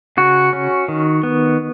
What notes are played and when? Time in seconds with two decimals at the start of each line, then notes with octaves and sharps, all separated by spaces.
0.17 C#3 F#4
0.53 C#4
0.88 D#3
1.23 B3